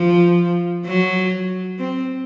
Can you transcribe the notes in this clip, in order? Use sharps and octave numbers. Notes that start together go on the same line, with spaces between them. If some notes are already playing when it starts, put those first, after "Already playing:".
Already playing: F3
F#3
C4